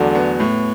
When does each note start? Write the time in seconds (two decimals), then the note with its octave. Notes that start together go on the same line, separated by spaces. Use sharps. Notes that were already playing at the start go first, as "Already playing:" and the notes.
Already playing: E2 D3 F#3 A3
0.15 B3
0.40 A2